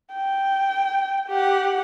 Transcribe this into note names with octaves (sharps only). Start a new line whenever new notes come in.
G5
G4 F#5